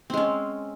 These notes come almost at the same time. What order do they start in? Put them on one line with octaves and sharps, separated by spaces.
C4 G#3 C#4